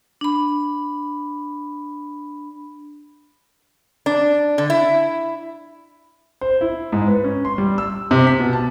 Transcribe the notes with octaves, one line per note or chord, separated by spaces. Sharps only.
D4 B5
D4
D3
E4
C5
E4
G#2
B4
C#4
C6
G3
E6
C3
B6
B2
A5